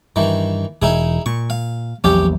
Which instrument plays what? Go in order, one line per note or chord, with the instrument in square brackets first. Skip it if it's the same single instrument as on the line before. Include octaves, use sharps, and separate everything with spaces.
[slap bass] G2 [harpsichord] D#3 E3
[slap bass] E1 [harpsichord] D#4 E4 G#4
[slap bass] A#2 [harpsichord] C#6
[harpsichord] F5
[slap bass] A#1 E2 F#3 [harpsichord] C#4 G4